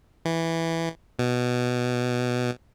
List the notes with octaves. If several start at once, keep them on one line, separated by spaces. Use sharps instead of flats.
E3
B2